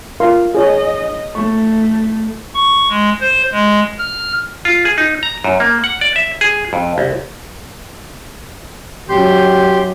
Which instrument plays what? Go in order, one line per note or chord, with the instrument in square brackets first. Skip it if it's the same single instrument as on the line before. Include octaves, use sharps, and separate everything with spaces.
[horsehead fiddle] F4 [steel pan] A#4 F5 C6
[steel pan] G#4 C#5 G#5 [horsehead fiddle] D#5
[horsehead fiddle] A3 [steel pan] C#6
[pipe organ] C#6
G#3
C5
G#3
F6
[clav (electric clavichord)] F4
G#4
D#4
A#5
F#2
A#3
F#5
D5
E5
G#4
F2
C2
[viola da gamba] F#2 [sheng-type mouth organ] G4 C6 G6